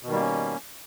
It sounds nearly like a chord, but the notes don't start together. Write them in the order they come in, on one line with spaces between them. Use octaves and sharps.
B2 D#3 G3 A#3 C#4